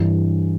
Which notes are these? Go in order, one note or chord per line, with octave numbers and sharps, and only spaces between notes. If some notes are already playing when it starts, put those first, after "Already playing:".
Already playing: G2 E3